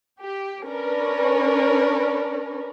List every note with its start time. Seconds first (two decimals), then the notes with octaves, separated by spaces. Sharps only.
0.21 G4
0.64 C#4 D4 A#4 B4 D5